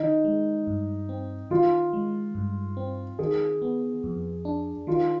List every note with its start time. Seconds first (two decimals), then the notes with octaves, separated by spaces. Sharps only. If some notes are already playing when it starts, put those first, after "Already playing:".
Already playing: D#3 D#4
0.24 G#3
0.67 G2
1.09 C4
1.50 D#3 F4
1.93 G#3
2.35 G2
2.77 C4
3.19 D#3 G#4
3.62 B3
4.03 F2
4.45 D4
4.87 D#3 F4